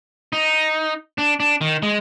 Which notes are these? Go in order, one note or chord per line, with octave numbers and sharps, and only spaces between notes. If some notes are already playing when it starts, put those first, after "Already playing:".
D#4
D4
D4
D#3
G#3